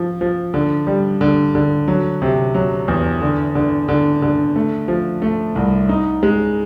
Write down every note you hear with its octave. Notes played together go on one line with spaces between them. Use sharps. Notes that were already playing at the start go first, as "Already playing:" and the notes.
Already playing: F3
F3
D3
G3
D3
D3
F#3
C3
F#3
E2
D3
D3
D3
D3
A3
F3
A3
C2
D#4
G#3